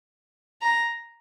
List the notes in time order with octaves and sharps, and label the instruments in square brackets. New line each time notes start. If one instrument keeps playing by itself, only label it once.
[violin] A#5